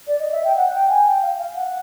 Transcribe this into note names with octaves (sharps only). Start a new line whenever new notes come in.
D5
D#5
E5
G5
F#5
G5
G#5
G5
F5
F5
F#5